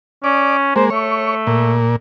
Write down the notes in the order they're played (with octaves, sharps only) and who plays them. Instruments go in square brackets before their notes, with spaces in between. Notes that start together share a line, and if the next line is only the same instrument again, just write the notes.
[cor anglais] C#4 [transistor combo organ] D5
[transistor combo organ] G#3 A#3 [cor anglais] C5
[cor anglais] A3 [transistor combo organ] C#5
[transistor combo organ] A#2